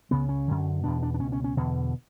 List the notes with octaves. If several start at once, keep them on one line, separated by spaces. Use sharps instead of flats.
C#2 C#3 B3
C#4
F#2 D3
E2 B2 D4
D4
D4
C#2 B2 C#4
C#4
C#4
E2 B2 D3